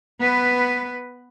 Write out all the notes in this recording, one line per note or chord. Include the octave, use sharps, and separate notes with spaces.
B3 B4